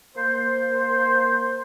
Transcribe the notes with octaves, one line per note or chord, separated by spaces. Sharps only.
A#3 C5